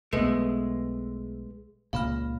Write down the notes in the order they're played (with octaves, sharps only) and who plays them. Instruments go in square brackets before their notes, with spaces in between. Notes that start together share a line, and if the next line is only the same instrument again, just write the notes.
[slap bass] B1 B3 [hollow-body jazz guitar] G#3 A3 [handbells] B4
[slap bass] C#2 A#2 C#3 [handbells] F5 B5 F6